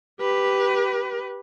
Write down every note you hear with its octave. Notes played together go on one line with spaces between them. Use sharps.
G4 B4